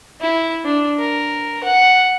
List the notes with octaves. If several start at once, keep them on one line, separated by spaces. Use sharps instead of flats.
E4
D4
A#4
F#5